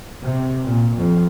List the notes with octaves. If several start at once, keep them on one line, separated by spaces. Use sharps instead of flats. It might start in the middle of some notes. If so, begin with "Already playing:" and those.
C3
A#2
F2